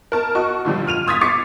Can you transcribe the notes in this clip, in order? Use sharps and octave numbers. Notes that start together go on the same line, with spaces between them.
A#4 A5
F#4 D#5 C#6
A#2 D3 F3 G3
F6 D#7 F7
C6 D#6 G#6 A6 B6
D6 A6 C7 C#7